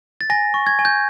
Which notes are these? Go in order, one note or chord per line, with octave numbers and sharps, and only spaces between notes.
A6
G#5 A#6
C#6
G#6
G#5
G6